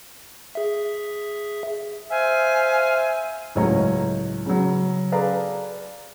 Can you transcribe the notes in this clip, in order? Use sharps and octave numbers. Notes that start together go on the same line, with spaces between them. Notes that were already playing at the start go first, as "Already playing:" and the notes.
G#4 E5
C5 E5 F5 G#5
C#2 A2 F#3 C#5 D#5 A#5
C#3 F#3
G#4 A4 B4 D5 F5 A#5